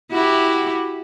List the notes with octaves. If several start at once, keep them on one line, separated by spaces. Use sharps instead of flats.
E4 F#4 G4